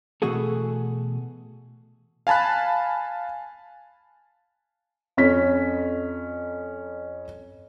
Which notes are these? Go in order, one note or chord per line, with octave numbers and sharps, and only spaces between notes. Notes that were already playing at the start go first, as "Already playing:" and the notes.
B2 E3 A3 F#4 G#4 A4
F5 G#5 A5 B5 F#6
F2 C#4 B6